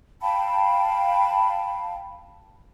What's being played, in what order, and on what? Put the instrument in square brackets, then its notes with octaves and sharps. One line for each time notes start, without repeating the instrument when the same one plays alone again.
[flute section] F5 G5 A5 B5